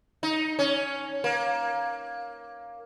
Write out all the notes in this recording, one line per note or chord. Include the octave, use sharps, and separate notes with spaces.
D#4
C#4
A#3